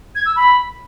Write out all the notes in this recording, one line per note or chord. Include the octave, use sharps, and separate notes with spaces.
G#6
E6
B5